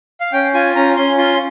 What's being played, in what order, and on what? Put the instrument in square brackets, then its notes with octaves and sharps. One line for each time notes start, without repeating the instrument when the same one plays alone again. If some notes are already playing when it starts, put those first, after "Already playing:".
[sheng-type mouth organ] F5
C#4 G5
F4 G#5
C#4 A#5
C#4 C6
F4 C6